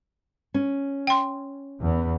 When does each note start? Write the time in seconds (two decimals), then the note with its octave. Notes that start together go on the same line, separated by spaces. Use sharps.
0.54 C#4
1.07 G5 C6
1.82 E2